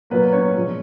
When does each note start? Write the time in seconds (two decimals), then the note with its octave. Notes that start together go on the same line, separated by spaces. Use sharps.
0.10 A#2 F#3 A#3 B3 B4
0.32 C#4 C#5
0.55 A#2 F3 G#3